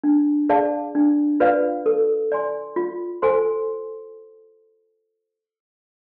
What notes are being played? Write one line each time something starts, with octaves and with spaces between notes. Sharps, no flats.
D4
G#4 D5 F5 A5
D4
F4 B4 D5 F5
A4
D5 G#5 C6
F4
A4 C5 G#5 C6